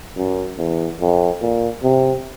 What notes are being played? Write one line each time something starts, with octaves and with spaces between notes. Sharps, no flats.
F#2
E2
F2
A#2
C3